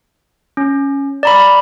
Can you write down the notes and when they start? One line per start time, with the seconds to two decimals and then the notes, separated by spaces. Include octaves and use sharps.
0.57 C#4
1.23 D5 A#5 B5